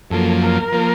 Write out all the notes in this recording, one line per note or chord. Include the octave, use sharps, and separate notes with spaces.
F#2 F3 A#3 A4
A#4
F3 A#3